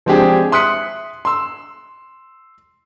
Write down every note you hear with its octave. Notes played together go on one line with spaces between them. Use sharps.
F3 G#3 C4 D4 G4 G#4
E5 C6 D#6 F#6 B6 C#7
C6 E6